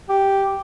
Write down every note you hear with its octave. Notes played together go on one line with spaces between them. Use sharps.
G4